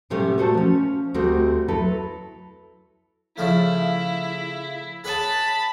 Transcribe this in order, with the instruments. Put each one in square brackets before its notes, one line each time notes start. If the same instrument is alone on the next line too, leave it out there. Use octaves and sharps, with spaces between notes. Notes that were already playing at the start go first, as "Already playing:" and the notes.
[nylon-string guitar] A2 C3 G3 A3 B3 C#4
A#2 A3 F#4 C5 A5
F3 C#4
D2 G3 A3 C4 F#4 D#5
F#3 E4 A4 B4
[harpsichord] C#3 F3 A3 [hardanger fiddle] E4
[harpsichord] G#4 B4 C#5 [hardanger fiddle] A5 B5